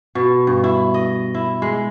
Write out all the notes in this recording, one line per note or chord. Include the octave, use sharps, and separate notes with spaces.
B2
G2
E4
D#5
E4
G#3